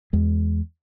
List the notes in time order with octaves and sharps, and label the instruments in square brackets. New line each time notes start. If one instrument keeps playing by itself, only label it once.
[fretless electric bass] E2 G#3